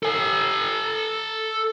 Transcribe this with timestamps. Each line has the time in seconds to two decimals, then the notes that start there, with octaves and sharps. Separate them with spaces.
0.03 A4 G#5